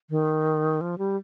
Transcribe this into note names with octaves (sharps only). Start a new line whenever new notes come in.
D#3
F3
G3